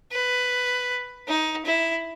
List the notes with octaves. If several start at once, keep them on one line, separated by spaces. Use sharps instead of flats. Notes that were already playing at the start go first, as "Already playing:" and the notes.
B4
D#4
E4